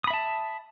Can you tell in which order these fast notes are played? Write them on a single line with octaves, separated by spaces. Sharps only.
D#6 B5 E5 A5